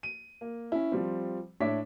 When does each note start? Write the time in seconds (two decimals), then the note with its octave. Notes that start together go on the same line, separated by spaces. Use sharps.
0.03 D#7
0.41 A#3
0.72 C#4 E4
0.92 F3 G3 C4
1.60 A2 D4 C#5 E5 D6 B6